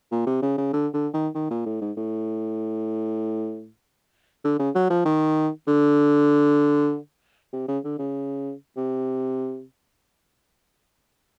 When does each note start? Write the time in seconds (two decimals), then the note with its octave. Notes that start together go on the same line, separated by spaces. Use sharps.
0.11 A#2
0.27 C3
0.42 C#3
0.58 C#3
0.73 D3
0.94 D3
1.14 D#3
1.35 D#3
1.50 A#2
1.66 A2
1.81 G#2
1.97 A2
4.44 D3
4.59 C#3
4.75 F#3
4.90 F3
5.05 D#3
5.67 D3
7.53 C3
7.68 C#3
7.84 D3
7.99 C#3
8.77 C3